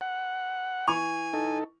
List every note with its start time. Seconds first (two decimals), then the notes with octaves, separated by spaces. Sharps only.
0.01 F#5
0.87 E3 G#5 C#6 F7
1.33 D#4 A4